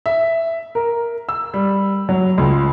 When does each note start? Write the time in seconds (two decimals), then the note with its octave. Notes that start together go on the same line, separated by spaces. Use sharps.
0.06 E5
0.75 A#4
1.29 E6
1.54 G3
2.09 F#3
2.38 C#2